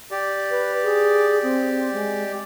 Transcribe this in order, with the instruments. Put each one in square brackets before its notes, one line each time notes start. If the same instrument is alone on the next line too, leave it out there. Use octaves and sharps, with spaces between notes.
[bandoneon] G4 D5
[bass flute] B4
G#4
C4
G#3